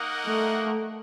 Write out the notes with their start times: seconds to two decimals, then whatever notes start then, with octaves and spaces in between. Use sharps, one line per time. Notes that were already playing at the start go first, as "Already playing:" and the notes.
Already playing: A#3 D#4 A#4 D#5 F#5
0.26 A3